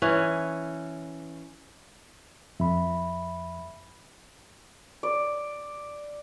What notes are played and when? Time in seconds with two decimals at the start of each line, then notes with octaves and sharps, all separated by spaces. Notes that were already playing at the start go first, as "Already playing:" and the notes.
0.02 E3 C#4
2.60 F2 E5 B5
5.03 D5